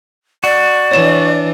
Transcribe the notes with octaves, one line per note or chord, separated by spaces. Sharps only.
F#4 D5
E3 D4 C#5 E7